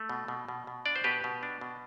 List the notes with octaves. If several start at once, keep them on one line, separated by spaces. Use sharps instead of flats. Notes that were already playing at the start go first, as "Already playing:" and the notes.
Already playing: A3
B2
B2
B2
B2
D4 D5
C5
B2 G4 B4
B2
D4
B2